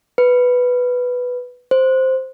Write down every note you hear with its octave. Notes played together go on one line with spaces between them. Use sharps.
B4
C5